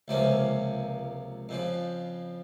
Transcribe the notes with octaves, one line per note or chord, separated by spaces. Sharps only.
C#2 C3 F3 A#3 C#4
F2 C#3 F3